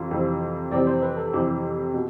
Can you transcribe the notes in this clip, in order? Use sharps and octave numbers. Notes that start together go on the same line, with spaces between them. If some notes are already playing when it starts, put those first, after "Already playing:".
Already playing: F2 C3 E3 F4
F2 C3 E3 G3 C4
F2 C3 E3 G3 C4 D5
C5
B4
A4
F2 C3 E3 G3 C4 G4
B2